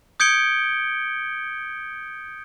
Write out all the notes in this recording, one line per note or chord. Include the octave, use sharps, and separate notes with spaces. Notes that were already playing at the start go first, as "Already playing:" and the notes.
D#6 G6 G#6 C#7 D7 G7